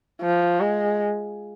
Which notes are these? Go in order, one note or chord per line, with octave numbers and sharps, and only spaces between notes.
F3
G#3